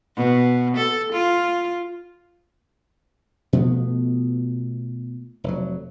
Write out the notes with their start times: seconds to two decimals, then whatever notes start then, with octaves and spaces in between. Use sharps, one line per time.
0.16 B2
0.77 A4
1.12 F4
3.53 B2 F3 A3 B3
5.44 F1 F#3